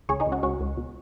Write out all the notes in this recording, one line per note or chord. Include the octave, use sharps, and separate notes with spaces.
C#2 G#4 C#5
D#4 G#4
C#2
C#4 F#4
C#2 C#4 F#4
C#2
B2